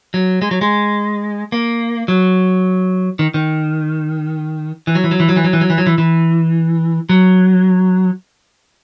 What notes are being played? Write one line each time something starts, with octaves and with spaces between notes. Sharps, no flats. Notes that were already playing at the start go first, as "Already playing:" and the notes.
F#3
G#3
F#3
G#3
A#3
F#3
D#3
D#3
E3
F#3
E3
F#3
E3
F#3
E3
F#3
E3
F#3
E3
F#3
E3
E3
F#3